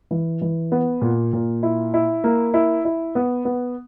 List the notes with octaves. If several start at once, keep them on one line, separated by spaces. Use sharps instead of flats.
E3
E3
B3
A#2
A#2
E4
E4
A#3
E4
E4
B3
B3